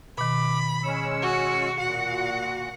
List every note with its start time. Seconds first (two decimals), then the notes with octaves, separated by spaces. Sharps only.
0.18 B2 D#3 B5 D6
0.83 G#3 C#4 E6 C#7
1.22 F#4
1.80 A#2 F#4 F#5